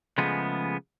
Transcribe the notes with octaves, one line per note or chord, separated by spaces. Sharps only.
C#3 F3 G#3 A3 B3